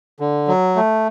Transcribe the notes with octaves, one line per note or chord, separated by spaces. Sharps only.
D3
F#3
A3